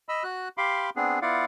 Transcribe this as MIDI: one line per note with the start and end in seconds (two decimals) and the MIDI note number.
0.09 0.23 75
0.09 0.23 83
0.09 0.23 88
0.24 0.48 66
0.24 0.48 90
0.58 0.90 67
0.58 0.90 77
0.58 0.90 83
0.58 0.90 84
0.58 0.90 86
0.96 1.19 59
0.96 1.19 60
0.96 1.19 62
0.96 1.19 68
1.22 1.45 59
1.22 1.45 64
1.22 1.45 65
1.22 1.45 74
1.22 1.45 77
1.22 1.45 78